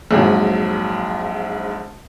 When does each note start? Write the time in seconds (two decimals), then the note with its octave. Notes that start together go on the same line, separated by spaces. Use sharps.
0.11 A#1 F2 G#2 F#3